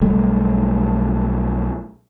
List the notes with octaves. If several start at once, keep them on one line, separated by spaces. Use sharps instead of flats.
B1 G3 A3